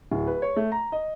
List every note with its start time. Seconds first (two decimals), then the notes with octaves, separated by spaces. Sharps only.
0.12 D1
0.27 B4
0.42 C#5
0.56 A3
0.72 A#5
0.92 D#5